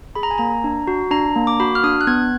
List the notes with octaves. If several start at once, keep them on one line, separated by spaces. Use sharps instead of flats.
G#4 B5
A#5
G#5
A#3 A#5
D4
F#4
D4 A#5
A#3
D6
F#4 B5
F6
D4 D#6
F#6
B3 G#6